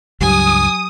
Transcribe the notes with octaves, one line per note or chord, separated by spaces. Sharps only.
C#2 G2 F#3 G4 G#5 D#6